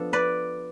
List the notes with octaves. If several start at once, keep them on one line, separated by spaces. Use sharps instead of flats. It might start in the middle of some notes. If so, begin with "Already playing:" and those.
Already playing: F3 B3 D4 A4
B4 D5